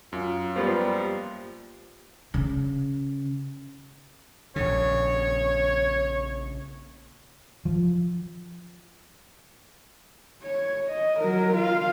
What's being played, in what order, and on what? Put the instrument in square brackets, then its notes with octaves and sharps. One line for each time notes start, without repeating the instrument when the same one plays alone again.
[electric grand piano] F#2 [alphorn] F4
[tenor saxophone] F3 [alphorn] G3 [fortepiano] A#3 B3 F4
[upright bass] C#3
[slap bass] A#1 C#3 [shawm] C#5
[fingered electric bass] F3
[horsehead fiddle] C#5
D#5
F#3 A#4
F4 F5